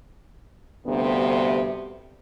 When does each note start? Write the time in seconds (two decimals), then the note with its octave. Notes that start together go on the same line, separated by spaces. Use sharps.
0.86 D2 G2 C3 B3